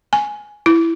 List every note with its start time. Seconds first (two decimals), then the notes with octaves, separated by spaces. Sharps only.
0.13 G#5
0.66 E4